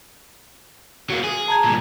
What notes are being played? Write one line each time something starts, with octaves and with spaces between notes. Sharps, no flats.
F#3 A#3
G#4
A5 A#5 G#6
C2 A#2